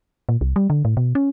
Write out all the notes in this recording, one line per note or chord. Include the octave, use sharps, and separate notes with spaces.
A#2
C2
G3
D3
A2
B2
C#4